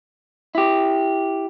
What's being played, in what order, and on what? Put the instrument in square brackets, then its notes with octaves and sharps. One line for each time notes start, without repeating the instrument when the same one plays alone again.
[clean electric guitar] E4 G4